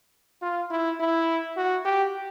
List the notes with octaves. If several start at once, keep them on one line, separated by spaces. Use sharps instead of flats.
F4
E4
E4
F#4
G4